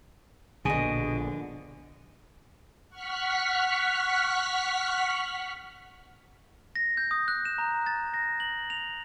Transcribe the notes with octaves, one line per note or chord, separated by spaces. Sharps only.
A#1 B2 D3 G#4 D#5
F#5 C#6 F6 F#6 B6
A#6
G6
D#6
F#6
E7
A#5
A6
A#6
F#7
F7